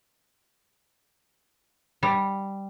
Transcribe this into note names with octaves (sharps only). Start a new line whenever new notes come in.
G3